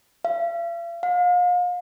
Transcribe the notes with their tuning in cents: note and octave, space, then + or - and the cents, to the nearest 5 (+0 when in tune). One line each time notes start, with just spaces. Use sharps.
F5 -45
F5 +35